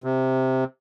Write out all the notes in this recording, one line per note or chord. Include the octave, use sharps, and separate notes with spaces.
C3